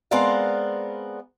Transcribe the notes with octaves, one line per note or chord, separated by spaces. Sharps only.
G#3 B3 C4 A#4 D5 F5